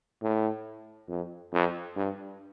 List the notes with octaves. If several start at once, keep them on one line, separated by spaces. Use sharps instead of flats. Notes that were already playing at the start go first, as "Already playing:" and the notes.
A2
F2
F2
G2